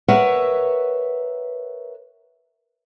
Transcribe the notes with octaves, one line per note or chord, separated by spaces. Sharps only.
A#4 B4 C#5 E5 F#5